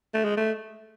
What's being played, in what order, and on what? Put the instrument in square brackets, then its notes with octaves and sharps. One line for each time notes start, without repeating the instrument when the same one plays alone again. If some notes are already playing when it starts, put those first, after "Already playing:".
[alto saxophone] A3
G#3
A3